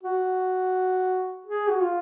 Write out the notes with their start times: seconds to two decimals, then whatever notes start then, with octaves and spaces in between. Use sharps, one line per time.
0.03 F#4
1.46 G#4
1.70 F#4
1.82 F4